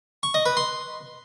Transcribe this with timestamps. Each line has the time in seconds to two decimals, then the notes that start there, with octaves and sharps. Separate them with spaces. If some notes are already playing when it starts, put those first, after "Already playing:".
0.23 C#6
0.34 D#5
0.46 B4
0.57 C6